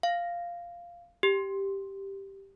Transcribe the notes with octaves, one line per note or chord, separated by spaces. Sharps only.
F5
G4